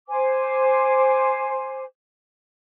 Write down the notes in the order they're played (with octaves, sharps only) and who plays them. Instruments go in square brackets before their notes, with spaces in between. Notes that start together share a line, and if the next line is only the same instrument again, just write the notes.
[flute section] C5 G#5 D6